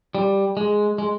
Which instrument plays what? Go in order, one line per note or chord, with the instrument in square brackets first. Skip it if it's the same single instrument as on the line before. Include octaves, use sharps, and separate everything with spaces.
[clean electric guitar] G3
G#3
G#3